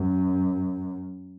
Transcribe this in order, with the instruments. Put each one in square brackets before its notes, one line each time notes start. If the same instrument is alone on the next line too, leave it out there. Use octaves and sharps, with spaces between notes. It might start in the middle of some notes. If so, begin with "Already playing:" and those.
Already playing: [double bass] F#2